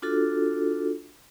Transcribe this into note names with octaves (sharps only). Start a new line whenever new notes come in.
D4 F4 F#4 A4